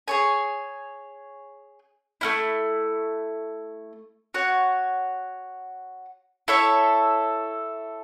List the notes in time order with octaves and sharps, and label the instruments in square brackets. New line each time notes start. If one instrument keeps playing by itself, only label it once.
[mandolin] G#4 C#5 G#5
A3 C#4 E4
F#4 C#5 F#5
E4 A4 C#5 E5